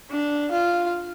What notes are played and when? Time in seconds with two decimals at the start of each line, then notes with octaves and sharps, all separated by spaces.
0.11 D4
0.51 F4